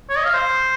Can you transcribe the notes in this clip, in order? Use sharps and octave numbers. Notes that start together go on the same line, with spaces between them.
C#5
D#5
F5
C5